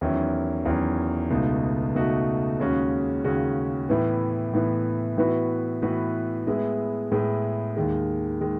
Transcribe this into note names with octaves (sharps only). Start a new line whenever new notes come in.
E2 D#3 F#3 C#4 E4
E2 D#3 F#3 C#4 E4
C#2 B2 A3 D#4 F#4
C#2 B2 A3 D#4 F#4
D#2 C#3 G#3 C#4 F#4
D#2 C#3 G#3 C#4 F#4
A2 E3 B3
A2 E3 B3
A2 E3 B3 F#4 B4
A2 E3 B3 F#4 B4
A2 G#3 B3 E4 G#4
A2 G#3 B3 E4 G#4
D#2 D#3 G#3
D#3 G#3